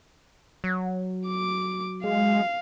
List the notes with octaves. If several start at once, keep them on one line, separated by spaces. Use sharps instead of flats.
F#3
D6
G#3 F5